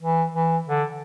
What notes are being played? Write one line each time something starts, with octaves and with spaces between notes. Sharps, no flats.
E3
E3
D3